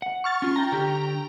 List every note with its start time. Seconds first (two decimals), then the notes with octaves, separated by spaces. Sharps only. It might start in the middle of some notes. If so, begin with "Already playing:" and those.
0.02 F#5
0.24 C#6 F6 A6
0.42 C#4 F4
0.56 G5 A#5
0.72 D3 G4